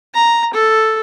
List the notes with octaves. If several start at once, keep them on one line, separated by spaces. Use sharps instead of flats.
A#5
A4